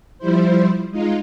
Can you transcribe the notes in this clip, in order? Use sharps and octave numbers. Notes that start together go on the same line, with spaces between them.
F3 G3 E4 C5
G#3 D#4 F4